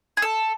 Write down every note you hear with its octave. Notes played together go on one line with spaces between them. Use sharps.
G#4
A4